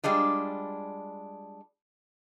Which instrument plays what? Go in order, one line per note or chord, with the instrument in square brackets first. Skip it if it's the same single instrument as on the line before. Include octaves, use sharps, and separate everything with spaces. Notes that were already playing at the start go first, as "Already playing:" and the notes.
[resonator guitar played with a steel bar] G3 G#3 D4 F4